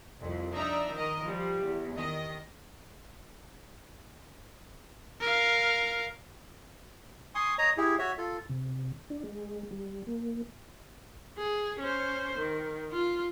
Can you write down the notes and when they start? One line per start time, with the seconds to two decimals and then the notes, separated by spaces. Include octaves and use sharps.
0.21 C2 F2
0.54 D4 D#4 D5 E5 A#5
0.94 D#3 A#4 D#5
1.25 F3 G3
1.64 E2
1.96 D#3 D#5
5.20 A#4 F5
7.35 G#5 C6 C#6 D#6
7.58 C#5 D#5 A#5 D#6
7.77 E4 G4 G#4
7.99 F#4 C#5 E5
8.18 F4 A4
8.49 C3
9.10 D4
9.24 G#3
9.71 G3
10.07 A#3
11.38 G#4
11.80 C#4 C5
12.38 D#3
12.92 F4